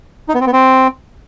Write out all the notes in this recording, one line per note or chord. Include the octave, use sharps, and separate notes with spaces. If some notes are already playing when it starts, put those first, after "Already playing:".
D#4
B3
C4
B3
C4